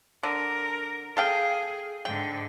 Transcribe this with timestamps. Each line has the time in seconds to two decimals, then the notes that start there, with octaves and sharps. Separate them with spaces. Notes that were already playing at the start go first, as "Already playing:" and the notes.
0.23 D3 A#4
1.17 G#4 A4 F5 G5
2.05 G#2 D3 G5